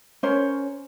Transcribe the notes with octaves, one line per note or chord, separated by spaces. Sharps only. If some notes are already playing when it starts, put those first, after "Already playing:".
C#4 A#4 C5 C#5